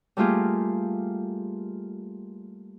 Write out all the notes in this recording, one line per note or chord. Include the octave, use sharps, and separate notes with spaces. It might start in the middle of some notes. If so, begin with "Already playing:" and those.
G3 A3 A#3 F4 G4 G#4